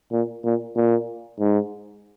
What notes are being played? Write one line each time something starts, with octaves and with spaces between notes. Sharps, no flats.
A#2
A#2
A#2
G#2